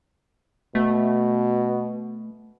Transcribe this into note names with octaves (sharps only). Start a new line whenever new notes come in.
B2 A3